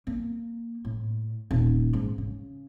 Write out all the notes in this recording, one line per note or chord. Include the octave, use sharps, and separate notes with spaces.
A#3
A2
D#1
G#2
C#3